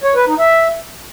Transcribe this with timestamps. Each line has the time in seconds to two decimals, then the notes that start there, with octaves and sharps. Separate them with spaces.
0.03 C#5
0.15 B4
0.27 D#4
0.39 E5